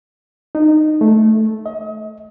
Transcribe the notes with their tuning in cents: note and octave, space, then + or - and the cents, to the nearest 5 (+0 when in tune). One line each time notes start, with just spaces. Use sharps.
D#4 -20
A3 -10
D#5 +35